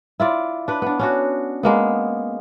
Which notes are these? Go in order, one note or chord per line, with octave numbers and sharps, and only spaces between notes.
E4 F4 D5
D4 B4
B3 D4
C#4 D4 F#4
G#3 A#3 B3